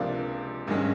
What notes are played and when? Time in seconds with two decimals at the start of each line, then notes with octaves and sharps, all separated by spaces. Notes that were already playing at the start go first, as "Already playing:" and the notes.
Already playing: C#2 C3 F3 A#3 D4
0.67 G#1 G2 D#3 G#3 C#4